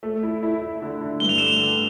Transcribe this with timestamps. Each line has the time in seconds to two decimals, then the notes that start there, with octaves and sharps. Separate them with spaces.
0.03 A3
0.23 E4
0.43 E4
0.62 E4
0.82 D3
1.01 D3
1.20 G2 G7
1.29 F7
1.38 A3 E7
1.47 F7
1.59 D3